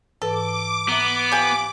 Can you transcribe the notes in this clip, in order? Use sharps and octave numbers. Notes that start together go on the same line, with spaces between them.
G#2 E3 A4 B4 D6
B3 E5 A#5
F3 G4 G#5